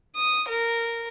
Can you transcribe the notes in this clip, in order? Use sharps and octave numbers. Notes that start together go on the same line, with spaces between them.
D#6
A#4